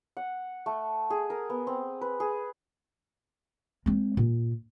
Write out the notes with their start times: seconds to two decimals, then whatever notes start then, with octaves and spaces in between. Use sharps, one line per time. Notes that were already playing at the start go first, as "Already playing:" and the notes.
0.17 F#5
0.66 A3
1.10 G#4
1.30 A#4
1.50 B3
1.67 C4
2.01 B4
2.20 G#4
3.86 G#3 C4
4.17 A#2